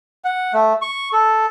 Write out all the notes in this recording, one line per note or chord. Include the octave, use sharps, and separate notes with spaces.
F#5
A3
C#6
A4